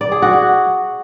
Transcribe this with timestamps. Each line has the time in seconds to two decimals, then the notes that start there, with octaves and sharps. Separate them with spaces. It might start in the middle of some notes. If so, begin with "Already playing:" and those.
0.01 D5
0.12 G#4
0.22 F#4